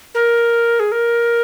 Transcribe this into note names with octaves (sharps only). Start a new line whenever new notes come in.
A#4
G#4
A#4